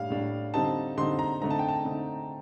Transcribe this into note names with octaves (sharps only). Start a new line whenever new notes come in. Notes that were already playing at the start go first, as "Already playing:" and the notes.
Already playing: A2 G3 D4 F5
A2 G3 D4
D3 G3 C4 D#4 A5
D3 G3 C4 D#4 C6
A#5
D3 A3 C4 D#4 A#5
A5
G5
A5
D3 A3 C4 D#4